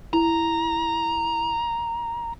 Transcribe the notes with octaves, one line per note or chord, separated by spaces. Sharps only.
E4 A#5